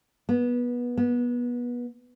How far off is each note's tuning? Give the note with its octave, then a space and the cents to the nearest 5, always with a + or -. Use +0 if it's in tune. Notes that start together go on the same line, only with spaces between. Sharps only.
B3 -20
B3 -25